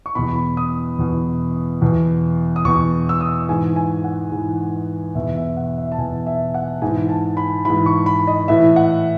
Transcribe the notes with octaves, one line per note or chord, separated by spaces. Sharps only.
C#6
E2 B2 B5
B5
D#6
E2 B2
E2 B2
D#6
E2 B2 C#6
E6
D#6
G#2 E3 G#5
G#5
F#5
G#2 E3
E2 B2 E5
E5
F#5
E5
A5
E2 B2 G#5
E5
F#5
G#2 E3 G#5
A5
B5
G#2 E3 B5
C#6
B5
D#5
A2 E3 E5
F#5